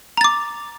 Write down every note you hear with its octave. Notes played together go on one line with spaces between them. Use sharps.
A#5 D6 A6